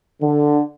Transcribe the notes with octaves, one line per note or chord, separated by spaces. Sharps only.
D3